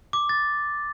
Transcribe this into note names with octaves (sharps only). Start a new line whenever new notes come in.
D6
A6